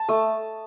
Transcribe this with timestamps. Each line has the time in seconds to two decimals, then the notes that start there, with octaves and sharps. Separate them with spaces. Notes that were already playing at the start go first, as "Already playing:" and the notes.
Already playing: A5
0.09 A3 D#6